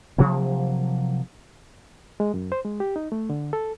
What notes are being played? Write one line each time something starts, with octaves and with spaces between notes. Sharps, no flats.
C3 F3 F#3 A#3
G#3
F#2
C5
G#3
G4
D#4
A3
D3
A4